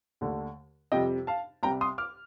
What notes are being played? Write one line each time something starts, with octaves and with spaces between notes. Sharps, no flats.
D#2 D3 A3
F2 C3 G3 D#5 G5
F5 A5
C2 C3 G3 G5 A#5
C6 D#6
D6 F6